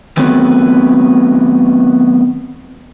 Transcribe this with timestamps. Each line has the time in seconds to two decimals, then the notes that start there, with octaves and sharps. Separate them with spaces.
0.17 D#3 F#3 A3 B3 C4